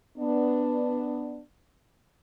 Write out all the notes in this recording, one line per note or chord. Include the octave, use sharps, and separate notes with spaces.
B3 D4